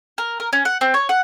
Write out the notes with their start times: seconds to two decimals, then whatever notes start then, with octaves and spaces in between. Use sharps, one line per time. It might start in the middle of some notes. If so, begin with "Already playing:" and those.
0.18 A#4
0.40 A#4
0.53 C#4
0.65 F#5
0.81 C4
0.94 C#5
1.09 F#5